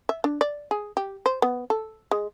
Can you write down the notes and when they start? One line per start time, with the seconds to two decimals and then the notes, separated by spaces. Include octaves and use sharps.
0.09 E5
0.24 D4
0.41 D5
0.71 G#4
0.97 G4
1.26 C5
1.42 B3
1.70 A4
2.11 G#3